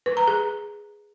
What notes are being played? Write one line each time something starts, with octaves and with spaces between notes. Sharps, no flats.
B4
A#5
G#4